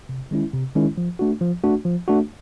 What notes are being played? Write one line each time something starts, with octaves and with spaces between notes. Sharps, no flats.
C3
D#3 G#3 C#4 E4
C3
D#3 G#3 C#4 E4
F3
A3 D4 F#4
F3
A3 D4 F#4
F3
A3 D4 F#4